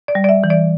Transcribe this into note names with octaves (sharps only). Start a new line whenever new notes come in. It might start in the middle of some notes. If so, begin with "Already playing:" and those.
D5
G3
D5
E5
E3
D5